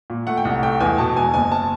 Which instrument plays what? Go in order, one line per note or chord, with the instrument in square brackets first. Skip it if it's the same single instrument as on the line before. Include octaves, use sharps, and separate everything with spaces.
[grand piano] A#2
A3 F#5
G5
C2 F#5
A3 G5
E2 G#5
B2 A5
E1 G#5
F#1 G#5
A5